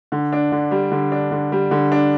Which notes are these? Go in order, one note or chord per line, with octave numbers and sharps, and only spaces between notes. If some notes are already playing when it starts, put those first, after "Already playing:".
D3
D4
D3
G3
D3
D4
D3
G3
D3
D4